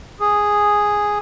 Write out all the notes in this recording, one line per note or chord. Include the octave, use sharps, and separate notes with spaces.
G#4